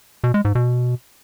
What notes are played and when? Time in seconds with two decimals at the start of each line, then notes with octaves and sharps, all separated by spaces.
0.24 B2
0.34 G#3
0.45 G#2
0.55 B2